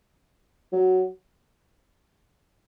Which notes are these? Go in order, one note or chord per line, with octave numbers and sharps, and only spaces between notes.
F#3